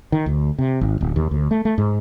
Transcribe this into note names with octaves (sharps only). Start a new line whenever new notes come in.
D#3
D2
C3
G#1
D1
D#2
D2
A3
A3
G#2